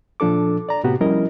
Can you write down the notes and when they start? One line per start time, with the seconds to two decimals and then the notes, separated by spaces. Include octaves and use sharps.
0.20 A#2 F3 D4 A4 D6
0.69 D5 A#5
0.84 A2 C3 B3 F#4 G4
1.01 F3 G3 C#4 E4 A#4 D#5